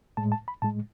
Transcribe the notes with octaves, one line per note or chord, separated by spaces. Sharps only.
A2 G#3 A5
A5
B5
A2 G#3 A5